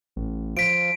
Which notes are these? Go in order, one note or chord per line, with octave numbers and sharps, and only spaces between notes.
A1
F3 B6 D7